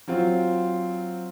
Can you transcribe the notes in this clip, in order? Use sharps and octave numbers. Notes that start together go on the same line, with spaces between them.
F#3 C4 F4